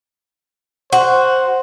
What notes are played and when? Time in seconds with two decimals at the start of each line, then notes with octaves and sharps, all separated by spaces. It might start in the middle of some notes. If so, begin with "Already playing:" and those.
0.92 F#4 C5